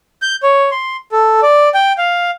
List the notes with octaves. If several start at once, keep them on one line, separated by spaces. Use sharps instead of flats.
G6
C#5
C6
A4
D5
G5
F5